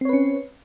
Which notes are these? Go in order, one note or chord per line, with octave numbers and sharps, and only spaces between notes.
C4 C#4 B4 C#5